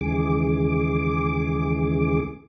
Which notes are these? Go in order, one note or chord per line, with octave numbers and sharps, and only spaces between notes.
D#2 C#3 E3 G#3 G#4 D6